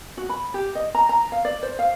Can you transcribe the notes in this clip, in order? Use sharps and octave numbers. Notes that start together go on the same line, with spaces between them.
F#4
B5
G4
D#5
A#5
A#5
F5
D5
C5
F5